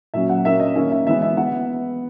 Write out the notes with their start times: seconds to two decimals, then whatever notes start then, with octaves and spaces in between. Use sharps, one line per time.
0.14 A#2 F#3 C#4 E5
0.29 F#5
0.45 A#2 A#3 C#4 E5
0.60 D#5
0.75 D#3 A#3 C#4 E5
0.92 E5
1.07 E3 G#3 B3 E5
1.22 E5
1.37 B3 F#5